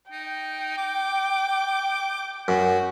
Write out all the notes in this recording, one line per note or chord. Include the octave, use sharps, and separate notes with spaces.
D#4 G5
D6
F#2 F#4